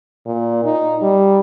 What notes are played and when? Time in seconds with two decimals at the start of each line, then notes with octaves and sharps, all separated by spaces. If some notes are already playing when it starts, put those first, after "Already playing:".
0.26 A#2
0.64 D#4
1.02 G3